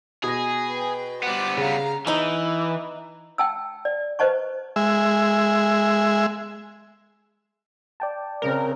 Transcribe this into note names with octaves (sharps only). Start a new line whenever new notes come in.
B2 G#4 A#6
B4 G5
G3 B3 C5 D6 F#6
C#3 F5 A#5
E3 B3 D#4
G5 A5 E6
D5
B4 C5 D#5 A5 C#6
G#3 E5
D5 G5 A5
C#3 C4 A#4